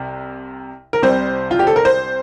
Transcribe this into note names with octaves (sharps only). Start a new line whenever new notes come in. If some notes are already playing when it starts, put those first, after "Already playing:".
Already playing: C2 C3
A#4
C2 C3 G3 C5
F4
G4
A4
A#4
C5